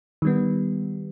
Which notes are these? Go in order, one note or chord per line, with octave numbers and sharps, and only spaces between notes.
D#3 G3 B3